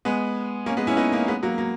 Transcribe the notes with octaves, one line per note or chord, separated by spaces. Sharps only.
G#3 B3
A#3 C#4
G#3 B3
C#4 E4
B3 D#4
A#3 C#4
G#3 B3
F#3 A#3
F#3 A#3